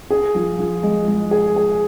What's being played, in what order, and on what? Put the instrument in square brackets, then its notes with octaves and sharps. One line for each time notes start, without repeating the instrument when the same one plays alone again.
[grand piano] G#4
F3
F3
G#3
G#3
G#4
G#4